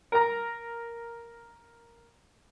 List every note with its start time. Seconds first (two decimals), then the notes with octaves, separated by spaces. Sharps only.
0.12 A#4 A#5